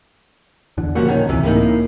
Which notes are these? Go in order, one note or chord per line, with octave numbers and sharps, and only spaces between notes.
E2 D3
A#2 C#3 F3 G3 A#3 F#4
D#3 C#4
C#2 C3 E3
A2 A#3 D#4